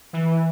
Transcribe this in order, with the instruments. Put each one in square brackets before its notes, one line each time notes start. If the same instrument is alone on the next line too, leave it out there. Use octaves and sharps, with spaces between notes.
[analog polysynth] E3